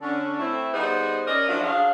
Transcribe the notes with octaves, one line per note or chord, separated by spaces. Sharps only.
D3 C#4 D4
A3 C4 E4
G3 B3 D#4 G#4 C5
C#4 A#4 D5 D#5
F3 F#3 A3 D4 E4 F4
F#3 D4 G#4 F5